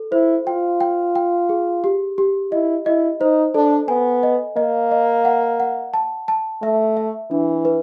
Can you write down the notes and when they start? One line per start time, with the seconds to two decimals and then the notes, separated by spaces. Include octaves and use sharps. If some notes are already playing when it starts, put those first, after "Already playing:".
Already playing: A4
0.12 E4 C5
0.47 F4 G5
0.81 G5
1.15 G5
1.49 G#4
1.84 G4
2.18 G4
2.52 E4 D#5
2.86 E4 D#5
3.20 D#4 C5
3.55 D4 A4
3.88 B3 G#5
4.23 D#5
4.57 A#3 D#5
4.91 D#5
5.25 F#5
5.60 F#5
5.94 A5
6.28 A5
6.62 A3 E5
6.97 E5
7.31 E3 D4
7.65 B4